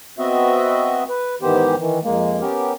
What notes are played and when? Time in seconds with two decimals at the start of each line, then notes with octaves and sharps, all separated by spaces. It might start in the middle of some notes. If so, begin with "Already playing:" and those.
0.19 B3 C4 F#4 D#5 E5
1.09 B4
1.42 G#2 D#3 E3 B3 G4 C5
1.79 D#3 E3
2.04 F2 G#3 A#3
2.41 B3 C#4 G4 A#4